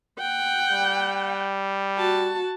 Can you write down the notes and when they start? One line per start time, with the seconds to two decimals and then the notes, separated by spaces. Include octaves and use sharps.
0.18 F#5 G5
0.71 G3
1.98 F#4 A5